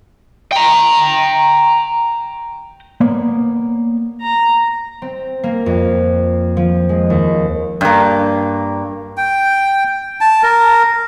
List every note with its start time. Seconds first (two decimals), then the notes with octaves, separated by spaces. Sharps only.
0.52 G5 A#5
3.01 A#3 B3 C#5 D5
4.21 A#5
5.02 C4
5.44 A#3
5.66 F2
6.57 F3
6.89 G#3
7.10 D#2
7.81 G2 A#3
9.17 G5
10.21 A5
10.43 A#4